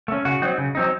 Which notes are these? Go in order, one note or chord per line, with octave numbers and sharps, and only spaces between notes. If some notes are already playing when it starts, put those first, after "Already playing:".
A3 C#4
C#3 F#4
F#3 C4 D#4
C#3
F#3 C4 D#4